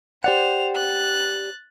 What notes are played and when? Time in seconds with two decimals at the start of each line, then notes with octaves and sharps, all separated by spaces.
0.24 G4 C5 D5 F#5 F7
0.76 F#6 A6